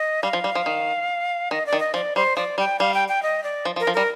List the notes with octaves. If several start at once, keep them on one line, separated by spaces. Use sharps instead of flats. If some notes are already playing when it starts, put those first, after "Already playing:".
Already playing: D#5
G3 F5
F3
G3
F3
D#3
D#3 D#5
D5
D#3
D#5
F3 D5
G3 C5
F3 D5
G3 G5
G3 F5
G5
G5
D#5
D5
F3
F3
A#4
F3
G3 A#4